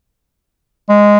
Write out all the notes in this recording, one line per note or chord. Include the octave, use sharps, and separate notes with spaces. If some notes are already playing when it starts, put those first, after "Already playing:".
G#3